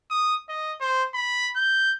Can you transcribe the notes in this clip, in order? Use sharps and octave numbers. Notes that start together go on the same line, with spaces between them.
D#6
D#5
C5
B5
G6